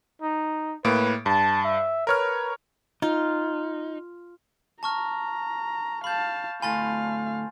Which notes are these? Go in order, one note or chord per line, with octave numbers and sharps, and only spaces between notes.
D#4
A2 A#3 B4 D7
G2 A5
E5
A#4 B4 C#5 F6
D#4 F4
A5 A#5 C#6 F6
F5 A5 B5 G6
D2 A2 F5 G#5 B5 C6 A6